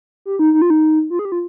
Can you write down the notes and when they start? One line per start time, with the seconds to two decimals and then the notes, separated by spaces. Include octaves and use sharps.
0.26 G4
0.39 D#4
0.54 D#4
0.62 F4
0.70 D#4
1.10 F4
1.19 G#4
1.25 G4
1.32 F4